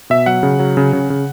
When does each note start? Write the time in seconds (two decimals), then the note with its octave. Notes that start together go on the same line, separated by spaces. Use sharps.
0.10 B2 E5
0.26 F#3 F#5
0.43 C#3
0.59 F#3
0.77 C#3
0.93 C#3
1.10 C#3